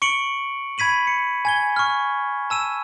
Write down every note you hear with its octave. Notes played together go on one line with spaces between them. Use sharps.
C#6 C#7 D7 F#7
B5 G#6 B6 D#7 F#7
C#7
G#5 G#6 G7
C#6 F6
A5 E6 D#7 E7